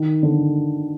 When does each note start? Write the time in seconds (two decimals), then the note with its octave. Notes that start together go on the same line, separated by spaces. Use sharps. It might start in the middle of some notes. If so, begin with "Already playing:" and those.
Already playing: D#3
0.23 D3